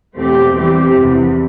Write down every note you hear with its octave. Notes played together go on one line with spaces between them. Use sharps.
E2 B2 A3 C4 G4
E3 G3 C4 G4
E2 C3 E3